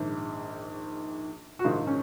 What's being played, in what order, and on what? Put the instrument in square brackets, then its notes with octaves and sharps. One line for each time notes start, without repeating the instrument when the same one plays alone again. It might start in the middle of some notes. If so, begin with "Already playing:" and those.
Already playing: [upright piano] A#1 G#2 D#3
F#4
A#1 G#2 D#3 F4
C#4